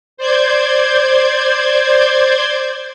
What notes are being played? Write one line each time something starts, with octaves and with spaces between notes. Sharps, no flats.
C5 D5 G6 G#6